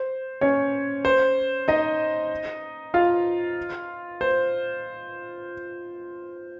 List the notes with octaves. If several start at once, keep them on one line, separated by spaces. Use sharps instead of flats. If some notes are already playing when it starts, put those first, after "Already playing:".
Already playing: C5
C#4 C#5
C5
D#4 D#5
F4 F5
C5